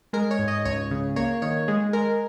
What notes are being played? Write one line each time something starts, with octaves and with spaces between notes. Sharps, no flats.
G#3 A#4
C#5
G#2
D#5
C#2 C#5
C#3
A#3 C#5
D#3 C#5
G#3 G#4
G#3 A#4